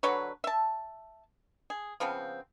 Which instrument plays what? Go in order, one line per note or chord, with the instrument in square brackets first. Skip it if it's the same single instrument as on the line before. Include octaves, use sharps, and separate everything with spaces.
[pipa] D3 F#3 B4 C#5
E5 A5
G#4
C#3 F3 B3 C4